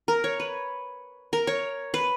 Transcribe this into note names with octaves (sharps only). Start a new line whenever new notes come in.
A#4
C#5
B4
A#4
C#5
B4